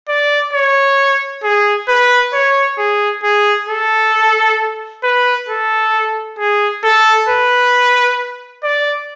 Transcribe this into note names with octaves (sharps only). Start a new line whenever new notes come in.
D5
C#5
G#4
B4
C#5
G#4
G#4
A4
B4
A4
G#4
A4
B4
D5